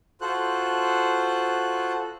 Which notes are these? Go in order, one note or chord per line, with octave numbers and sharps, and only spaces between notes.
F4 F#4 A4 C5 F#6